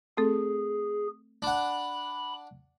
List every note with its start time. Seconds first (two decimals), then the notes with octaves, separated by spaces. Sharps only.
0.17 A3 C4 G#4 A4
1.42 D4 F#5 B5